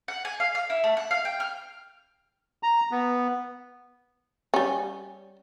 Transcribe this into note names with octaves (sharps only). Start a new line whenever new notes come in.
F#5
G#5
F5
F5
E4
A3
F#5
F5
G5
F6
A#5
B3
G3 C#4